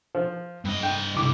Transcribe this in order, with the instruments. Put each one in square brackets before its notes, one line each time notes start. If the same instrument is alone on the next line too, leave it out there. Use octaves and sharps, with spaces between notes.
[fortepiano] F3
[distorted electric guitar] G2 D#5
[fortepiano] G5
[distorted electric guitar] C3 E3 [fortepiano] D6